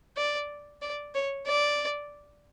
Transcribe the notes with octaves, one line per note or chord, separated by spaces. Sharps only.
D5
D5
C#5
D5